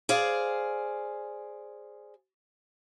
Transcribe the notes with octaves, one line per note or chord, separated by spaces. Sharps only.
G#4 C5 D5 F5